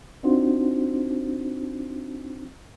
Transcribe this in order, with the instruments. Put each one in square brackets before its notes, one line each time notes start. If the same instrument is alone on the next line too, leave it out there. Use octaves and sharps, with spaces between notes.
[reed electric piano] C4 D4 D#4 F4 F#4 C5